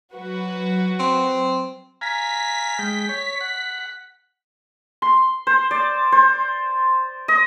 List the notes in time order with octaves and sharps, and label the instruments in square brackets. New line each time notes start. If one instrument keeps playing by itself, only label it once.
[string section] F#3 F#4 B4
[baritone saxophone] C4
[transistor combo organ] F5 G#5 A#5 [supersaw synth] B6
[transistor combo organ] G#3 G5
C#5
F#5
[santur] C6
C5
D5
C5
D#5